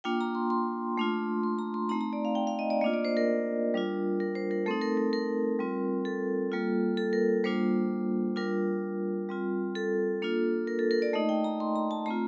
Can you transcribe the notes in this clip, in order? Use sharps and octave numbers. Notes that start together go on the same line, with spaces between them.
A#3 D4 F4 G5
A#5
C6
C6
A3 D4 F4
C6
A#5
C6
A3 C4 D#4 A#5
A#5
D5
F5
G5
F5
D#5
D5
A#3 D4 F4 D#5
D5
C5
A#4
G3 D4 F4
A#4
C5
A#4
A3 C4 D#4 A4
A#4
A#4
A#4
G3 C4 F4
A4
G3 A#3 F4
A4
A#4
G3 A#3 D4 F4 C5
G3 D4 F4 A#4
G3 C4 F4
A4
A#3 D4 F4
A#4
A4
A#4
D5
A3 D#4 D#5
G5
A#5
C6
A#5
A5
A3 C4 F4 A#5